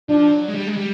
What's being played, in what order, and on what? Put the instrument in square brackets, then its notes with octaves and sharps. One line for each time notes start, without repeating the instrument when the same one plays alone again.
[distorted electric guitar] F3 [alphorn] D4
[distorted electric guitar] F#3
G#3
G3
G#3
G3